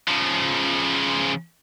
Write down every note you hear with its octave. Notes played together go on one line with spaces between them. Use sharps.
C#3 F3